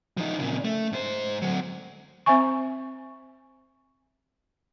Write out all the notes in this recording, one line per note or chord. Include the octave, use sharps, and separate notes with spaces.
F3 D#4
A#2 C#3
A3
G#2 C5
D2 F#3
C4 C5 E5 G#5 C#6